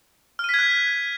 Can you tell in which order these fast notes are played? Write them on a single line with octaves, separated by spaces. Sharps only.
F6 D#7 B6 G#6 F#6